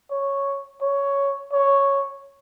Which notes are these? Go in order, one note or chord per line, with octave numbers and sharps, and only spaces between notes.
C#5
C#5
C#5